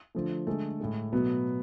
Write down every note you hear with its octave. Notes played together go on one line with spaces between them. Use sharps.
D3 F3 A3
D3 G#3 A3
A2 G#3
B2 F#3 A3 B3